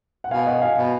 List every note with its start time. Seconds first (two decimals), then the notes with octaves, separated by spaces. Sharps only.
0.24 F#5
0.31 B2 F5 G#5
0.47 D#5 F#5
0.62 F5 G#5
0.77 B2